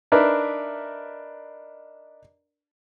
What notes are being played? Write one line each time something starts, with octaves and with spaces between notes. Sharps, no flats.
D4 D#4 A#4 B4 E5